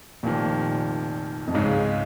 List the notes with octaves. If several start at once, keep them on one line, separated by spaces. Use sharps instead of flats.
F1 F2 A#2 D#3
F2
C#2 G#2 C#3 G#3 D#4